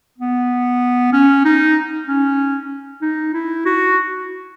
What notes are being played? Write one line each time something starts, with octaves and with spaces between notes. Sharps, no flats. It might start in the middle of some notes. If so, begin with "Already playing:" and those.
B3
C#4
D#4
C#4
D#4
E4
F#4